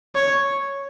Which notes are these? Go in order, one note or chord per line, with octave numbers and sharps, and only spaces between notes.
C#5